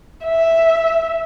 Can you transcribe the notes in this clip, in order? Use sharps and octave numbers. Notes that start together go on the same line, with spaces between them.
E5